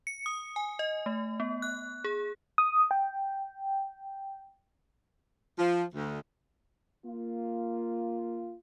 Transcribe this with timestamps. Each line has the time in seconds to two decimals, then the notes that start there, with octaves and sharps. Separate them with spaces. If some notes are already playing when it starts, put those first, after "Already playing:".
0.07 C#7
0.26 D#6
0.56 G#5
0.79 D#5
1.06 A3
1.40 B3
1.62 F#6
2.04 G#4
2.58 D#6
2.91 G5
5.59 F3
5.94 D2
7.06 A#3 F4